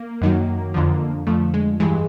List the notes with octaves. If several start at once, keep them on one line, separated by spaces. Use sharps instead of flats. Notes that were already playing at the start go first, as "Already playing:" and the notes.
Already playing: A#3
F#2 D#3 F#3
F2 D3 F3
F2 D3 F3 A3
G#3
G2 E3 G#3